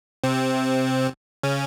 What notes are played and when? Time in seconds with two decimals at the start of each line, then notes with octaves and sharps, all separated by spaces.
0.24 C3 C4
1.43 C#3 C#4